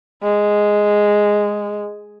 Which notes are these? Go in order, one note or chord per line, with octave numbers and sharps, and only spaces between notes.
G#3